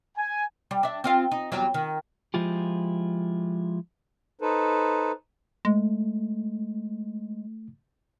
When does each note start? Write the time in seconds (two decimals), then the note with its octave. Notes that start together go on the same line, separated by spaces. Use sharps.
0.18 G#5
0.71 G3
0.83 D4 E5
1.04 C4 F4 F5
1.32 D#4
1.52 E2 F#3 G3
1.74 D#3
2.34 F3 G#3 E4 F4 G4
4.41 D#4 A4 B4 C5
5.65 G#3 A3